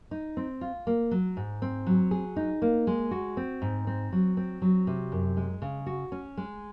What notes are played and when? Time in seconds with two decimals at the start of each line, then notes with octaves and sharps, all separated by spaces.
0.11 D#4
0.37 C4
0.61 F4
0.87 A#3
1.11 F#3
1.37 G#2
1.62 C4
1.87 F#3
2.11 G#4
2.36 D#4
2.62 A#3
2.87 G#3
3.11 F#4
3.37 C4
3.62 G#2
3.87 C4
4.12 F#3
4.37 C4
4.62 F#3
4.87 C3
5.12 F#2
5.37 G#3
5.62 C#3
5.86 F#4
6.12 C#4
6.37 G#3